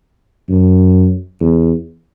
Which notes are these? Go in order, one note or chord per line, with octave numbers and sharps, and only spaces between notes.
F#2
E2